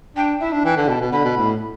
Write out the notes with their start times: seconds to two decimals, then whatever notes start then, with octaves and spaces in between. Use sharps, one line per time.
0.16 D4 G5
0.41 E4 E5
0.52 D4
0.64 E3 G5
0.77 D3
0.88 B2 A5
1.01 B2
1.12 D3 B5
1.25 B2
1.37 A2